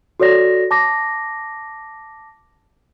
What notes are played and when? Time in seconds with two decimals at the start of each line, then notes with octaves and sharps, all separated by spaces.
0.20 F#4 A4 C#5 D5 A#6
0.71 A5 D6 A#6